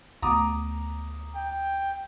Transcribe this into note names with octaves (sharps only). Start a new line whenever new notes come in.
D2 A3 B3 A#5 D6 D#6
G5